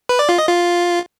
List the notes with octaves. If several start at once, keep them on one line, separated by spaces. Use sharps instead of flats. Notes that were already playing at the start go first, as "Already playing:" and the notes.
B4
D5
F4
D#5
F4